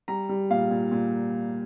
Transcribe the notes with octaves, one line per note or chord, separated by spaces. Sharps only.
G3 A#5
G3
A#2 F5
A#2
A#2